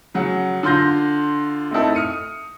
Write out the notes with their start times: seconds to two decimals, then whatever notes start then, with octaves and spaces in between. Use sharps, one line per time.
0.14 C#3 F#3 F#5
0.63 D3 F4 C6 G6 A#6
1.71 A3 C4 D#4 E4 A4
1.95 D#6 F6 C#7 D#7